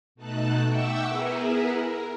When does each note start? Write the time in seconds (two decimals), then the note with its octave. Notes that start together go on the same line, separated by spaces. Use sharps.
0.15 B2 A3 D#4 A5 F#6
0.64 E5 F#5 G5 C#6 D6 E6
1.06 B3 E4 G#4 A#4 B4
1.81 A#4